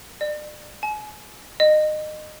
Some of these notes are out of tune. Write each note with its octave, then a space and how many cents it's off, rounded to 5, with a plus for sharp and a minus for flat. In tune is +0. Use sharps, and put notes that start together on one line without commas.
D5 +35
G#5 +35
D#5 -25